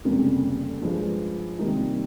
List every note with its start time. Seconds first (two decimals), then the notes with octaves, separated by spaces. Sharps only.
0.05 F1 F2 C#3 G3 A#3
0.81 G2 F3 G#3
1.59 C3 D#3 G3 A#3 D#4